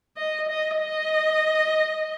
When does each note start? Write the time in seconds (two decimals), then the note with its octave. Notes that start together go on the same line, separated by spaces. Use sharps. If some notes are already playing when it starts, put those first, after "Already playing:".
0.17 D#5
0.49 D#5
0.80 D#5